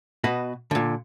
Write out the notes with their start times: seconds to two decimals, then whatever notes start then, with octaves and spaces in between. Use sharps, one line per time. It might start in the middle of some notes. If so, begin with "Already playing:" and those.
0.24 B2 F#4 B4 D#5
0.71 A#2 D3